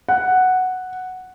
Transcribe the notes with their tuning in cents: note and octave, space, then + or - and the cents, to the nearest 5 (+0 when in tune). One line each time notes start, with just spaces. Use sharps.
F#5 +0